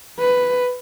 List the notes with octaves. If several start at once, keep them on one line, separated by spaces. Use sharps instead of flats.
B4